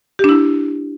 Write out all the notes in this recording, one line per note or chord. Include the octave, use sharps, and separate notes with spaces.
D4 E4 G4